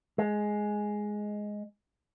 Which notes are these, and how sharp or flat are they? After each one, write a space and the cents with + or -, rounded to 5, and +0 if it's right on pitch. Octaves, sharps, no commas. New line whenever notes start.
G#3 +5